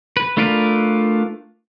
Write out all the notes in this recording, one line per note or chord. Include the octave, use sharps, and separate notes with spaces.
B4
A3 D4 F4 A#4 B4